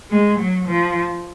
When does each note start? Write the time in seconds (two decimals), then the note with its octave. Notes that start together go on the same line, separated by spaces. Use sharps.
0.11 G#3
0.39 F#3
0.67 F3